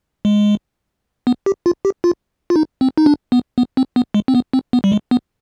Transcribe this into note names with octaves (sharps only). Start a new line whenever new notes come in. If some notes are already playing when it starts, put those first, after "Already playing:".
G#3
B3
G4
F4
G4
F4
F4
D#4
C4
D#4
D4
B3
B3
C4
B3
G#3
C4
B3
C4
B3
G3
G#3
B3